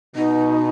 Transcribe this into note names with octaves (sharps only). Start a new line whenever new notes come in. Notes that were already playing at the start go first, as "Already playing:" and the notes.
B2 D#4